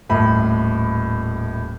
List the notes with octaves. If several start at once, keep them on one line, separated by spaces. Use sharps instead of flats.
D#1 A2 B5